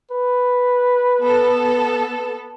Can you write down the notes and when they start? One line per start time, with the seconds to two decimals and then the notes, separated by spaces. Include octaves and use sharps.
0.11 B4
1.23 B3 A4